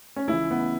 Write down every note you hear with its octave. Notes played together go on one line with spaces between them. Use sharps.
C#4
C#2 C#3 E3 E4
B3